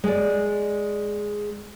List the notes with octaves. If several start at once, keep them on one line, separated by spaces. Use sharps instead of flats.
G#3 D5